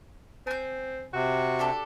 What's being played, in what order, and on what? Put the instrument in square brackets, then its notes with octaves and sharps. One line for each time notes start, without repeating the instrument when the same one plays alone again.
[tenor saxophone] C4 [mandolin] G#5 G6
[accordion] C3 [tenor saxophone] F#4
[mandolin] D4 G4 A4